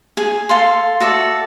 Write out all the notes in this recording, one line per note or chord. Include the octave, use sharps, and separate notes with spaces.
G#4 G#5
A4 F5 C6
F#4 A4 D5 E5